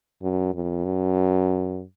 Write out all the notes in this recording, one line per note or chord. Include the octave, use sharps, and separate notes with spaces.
F#2
F2
F#2